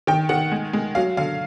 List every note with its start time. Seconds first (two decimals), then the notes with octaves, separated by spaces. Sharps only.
0.07 D#3 G5
0.29 D#3 F#5
0.52 G#3
0.73 G#3
0.95 F#3 F5
1.17 D3 F5